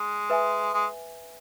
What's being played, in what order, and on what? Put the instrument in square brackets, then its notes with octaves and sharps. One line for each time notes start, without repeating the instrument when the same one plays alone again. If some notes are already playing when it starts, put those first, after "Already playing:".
Already playing: [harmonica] G#3
[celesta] B4 E5 G#5
[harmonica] G#3